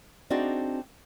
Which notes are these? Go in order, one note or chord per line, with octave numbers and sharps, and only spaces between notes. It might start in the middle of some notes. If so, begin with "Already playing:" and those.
C4 D4 D#4 F#4 G#4 D5